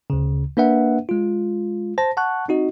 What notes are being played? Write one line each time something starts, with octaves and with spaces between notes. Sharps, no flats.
D2 C#3
A#3 D4 B4 E5 F#5
G#3 F4
C5 A5 A#6
F#5 A5 C#6 F#6
C4 D#4 F#4 D#5